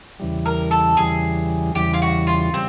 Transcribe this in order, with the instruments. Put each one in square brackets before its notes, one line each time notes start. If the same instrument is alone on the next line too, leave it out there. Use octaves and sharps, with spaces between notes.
[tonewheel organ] E2 C#3 E3 G3
[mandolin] A#4
A4
[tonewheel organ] E2 C#3 E3 G3 [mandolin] G#4
[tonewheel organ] E2 C#3 E3 G3 [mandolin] G4
[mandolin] F4
F#4
F4
[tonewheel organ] C#3 G3 [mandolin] C4